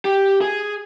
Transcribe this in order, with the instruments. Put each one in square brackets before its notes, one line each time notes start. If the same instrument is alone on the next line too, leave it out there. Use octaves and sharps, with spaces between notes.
[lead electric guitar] G4
G#4